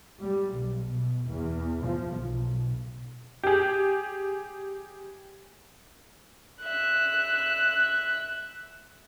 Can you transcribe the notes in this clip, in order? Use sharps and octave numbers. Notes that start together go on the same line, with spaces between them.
G3
B1
B2
E2
F3
B1
G4 G#4
E5 F#6